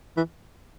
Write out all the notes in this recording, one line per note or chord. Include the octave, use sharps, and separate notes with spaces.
E3